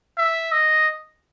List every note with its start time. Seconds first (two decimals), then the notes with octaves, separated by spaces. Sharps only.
0.17 E5
0.52 D#5